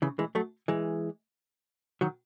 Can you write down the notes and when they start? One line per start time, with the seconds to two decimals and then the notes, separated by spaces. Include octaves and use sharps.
0.02 C#3 E3
0.19 E3 G#3
0.35 F#3 A3
0.68 E3 G#3
2.01 D#3 F#3